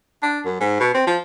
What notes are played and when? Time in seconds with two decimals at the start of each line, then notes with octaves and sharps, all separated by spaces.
0.23 D4
0.45 F#2
0.60 G#2
0.80 B2
0.95 C4
1.07 F3